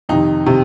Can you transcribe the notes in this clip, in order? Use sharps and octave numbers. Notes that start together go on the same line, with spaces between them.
F2 C3 D#3 D#4
C3 D#3